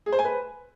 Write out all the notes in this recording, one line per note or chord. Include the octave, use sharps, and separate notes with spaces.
G#4
C5
G#5
B4